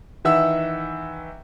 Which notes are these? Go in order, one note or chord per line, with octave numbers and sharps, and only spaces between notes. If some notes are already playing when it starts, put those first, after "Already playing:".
D#3 E3 E5 F#5 E6